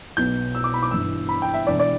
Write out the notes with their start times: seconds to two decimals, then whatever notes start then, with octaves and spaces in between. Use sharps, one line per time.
0.17 B1 B2 B3 G6
0.55 E6
0.64 D6
0.74 B5
0.83 D6
0.91 G1 G2 E3 E6
1.29 B5
1.42 G5
1.54 E5
1.66 E1 E2 E3 B3 D4 D5
1.79 D5